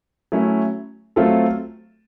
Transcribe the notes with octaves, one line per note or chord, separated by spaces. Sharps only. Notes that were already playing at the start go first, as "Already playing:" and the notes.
F#3 A3 C#4 E4
F#3 A3 C4 F4 A4